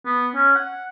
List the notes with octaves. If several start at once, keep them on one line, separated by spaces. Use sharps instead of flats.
B3
C#4
F#5